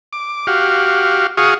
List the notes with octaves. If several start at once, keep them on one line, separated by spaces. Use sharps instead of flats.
D6
F#4 G4 F5
F#4 G#4 F5 C#6 D#6